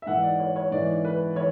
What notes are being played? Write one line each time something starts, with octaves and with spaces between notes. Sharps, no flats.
E5
G#2 E3 F#5
D5
C#5
C#5
G#2 E3 D5
B4
E3 C#5